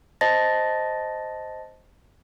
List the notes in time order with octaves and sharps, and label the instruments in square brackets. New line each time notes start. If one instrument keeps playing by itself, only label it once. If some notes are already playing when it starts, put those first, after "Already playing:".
[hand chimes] C5 D#5 A5 A6 A#6